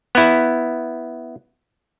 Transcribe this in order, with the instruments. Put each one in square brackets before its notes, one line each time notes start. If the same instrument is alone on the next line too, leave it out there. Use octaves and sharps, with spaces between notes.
[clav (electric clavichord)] B3 E4